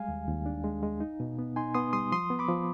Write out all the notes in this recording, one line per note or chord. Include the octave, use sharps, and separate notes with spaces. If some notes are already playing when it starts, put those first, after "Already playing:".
Already playing: G3 G#3 F5 G#5
D#2
D#2
D4
G#3
G#3
D#4
B2
B3
D#4 G#5 C6
B3 C6 D#6
G3 C6 D#6
F3 C6 D#6
B3
B5 D6
F3